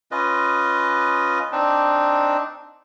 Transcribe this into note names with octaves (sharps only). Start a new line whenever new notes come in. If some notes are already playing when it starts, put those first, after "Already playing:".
C#4 F4 B4 D#5
C4 D4 D#4